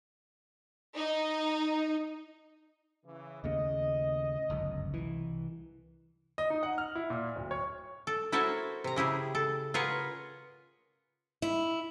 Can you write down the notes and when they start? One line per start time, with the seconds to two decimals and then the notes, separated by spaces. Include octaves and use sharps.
0.96 D#4
3.06 C#3 E3
3.44 D#2 A2 C#3 D#5
4.50 G1 C#2 F#2
4.94 C2 E3
6.38 D#5
6.50 D#4
6.63 F#5
6.78 F6
6.95 E4
7.10 A#2
7.36 D1
7.51 C#5
8.07 A4
8.32 E4 F#4 A4 A#4 C5 C#5
8.84 C3 A#5
8.96 C#3 E4 G4 G#4
9.35 A4
9.74 F4 G#4 A#4 B4 C#5 F#5
11.42 E4